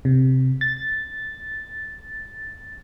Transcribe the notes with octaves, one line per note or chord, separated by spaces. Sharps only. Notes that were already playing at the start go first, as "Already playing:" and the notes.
C3
A6